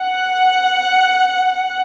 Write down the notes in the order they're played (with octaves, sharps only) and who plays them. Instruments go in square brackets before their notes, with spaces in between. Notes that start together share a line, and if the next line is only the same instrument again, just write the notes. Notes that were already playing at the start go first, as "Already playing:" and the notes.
Already playing: [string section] F#5